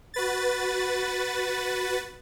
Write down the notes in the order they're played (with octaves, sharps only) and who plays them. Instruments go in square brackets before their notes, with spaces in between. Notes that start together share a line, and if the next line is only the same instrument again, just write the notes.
[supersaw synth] F#4 B4 A6